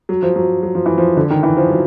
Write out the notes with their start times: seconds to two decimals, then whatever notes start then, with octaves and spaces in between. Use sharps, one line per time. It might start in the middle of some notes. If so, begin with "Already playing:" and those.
0.09 F#3
0.22 F3
0.36 F#3
0.63 F#3
0.75 F3
0.86 E3
0.98 F3
1.17 D3
1.30 D#3
1.43 E3
1.57 F3
1.70 F#3